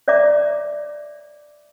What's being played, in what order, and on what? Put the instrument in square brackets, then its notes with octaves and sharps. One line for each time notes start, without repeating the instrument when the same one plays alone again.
[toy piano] C#5 D5 E5 A#5 D6